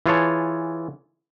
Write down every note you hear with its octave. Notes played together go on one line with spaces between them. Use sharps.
E3 F4 G#4 C#5 A5